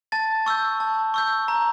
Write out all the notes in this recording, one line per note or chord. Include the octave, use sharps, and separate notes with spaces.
A5 A6
C#6 E6 G6
A5
C#6 E6 G6
A#5